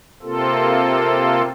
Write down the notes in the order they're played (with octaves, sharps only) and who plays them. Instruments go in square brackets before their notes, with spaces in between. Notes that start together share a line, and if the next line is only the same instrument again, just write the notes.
[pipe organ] C3 A#3 C4 F4 A4